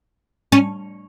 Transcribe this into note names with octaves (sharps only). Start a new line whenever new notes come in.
C#4